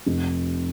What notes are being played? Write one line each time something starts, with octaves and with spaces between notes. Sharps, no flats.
F1